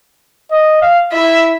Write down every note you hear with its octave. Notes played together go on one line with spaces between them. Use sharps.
D#5
F5
E4 E5